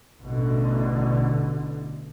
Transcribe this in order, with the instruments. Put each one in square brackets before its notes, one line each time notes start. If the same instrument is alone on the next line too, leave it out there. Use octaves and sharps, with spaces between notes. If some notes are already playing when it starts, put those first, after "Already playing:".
[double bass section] A1 B2 D3